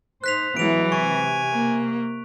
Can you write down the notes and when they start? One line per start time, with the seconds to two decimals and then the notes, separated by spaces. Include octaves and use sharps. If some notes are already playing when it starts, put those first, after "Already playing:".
0.24 D#4 C5 F#6 B6 F7
0.57 E3 F#3 G#3 B3 E4 D7 F7
0.92 C3 G#5 C#6
1.53 A#3